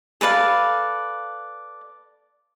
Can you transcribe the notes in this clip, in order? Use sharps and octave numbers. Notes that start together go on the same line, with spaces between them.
A4 B4 D5 F5